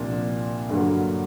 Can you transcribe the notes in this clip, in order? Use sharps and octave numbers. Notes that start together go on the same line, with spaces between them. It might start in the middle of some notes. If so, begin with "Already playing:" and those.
Already playing: C2 A#2 F3 A#3 D4
G2 D3 F#3 A#3